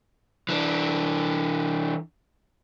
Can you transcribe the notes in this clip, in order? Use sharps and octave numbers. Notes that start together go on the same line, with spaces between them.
E3 D4